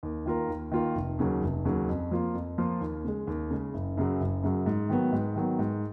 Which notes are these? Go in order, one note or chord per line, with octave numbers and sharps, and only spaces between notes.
D#2
D#3 A#3 F4 A#4
D#2
D#3 A#3 F4 A#4
F1
D#2 C#3 F#3
F1
D#2 C#3 F#3
F2
F3 A#3 F4
F2
F3 A#3 F4
D#2
C#3 G#3
D#2
C#3 G#3
F#1
F#2 C#3 F#3
F#1
F#2 C#3 F#3
G#2
D#3 F#3 B3
G#2
D#3 F#3 B3
G#2